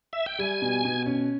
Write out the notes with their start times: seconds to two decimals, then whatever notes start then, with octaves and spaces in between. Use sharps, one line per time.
0.13 E5
0.26 G5
0.39 G3 G#5
0.62 B2
0.85 B2
1.06 C#4